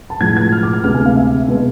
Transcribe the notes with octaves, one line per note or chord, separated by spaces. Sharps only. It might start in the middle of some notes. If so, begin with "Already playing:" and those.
A5
A2 F3 G#3 G#6
G#6
F6
D6
F6
D2 C3 G#3 B3 F6
G#5
F5
E5
B2 G#3 B3